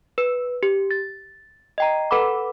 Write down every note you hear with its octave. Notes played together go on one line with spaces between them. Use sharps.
B4
G4
A6
D#5 G5 A#5
A4 B4 F#5 B5 D6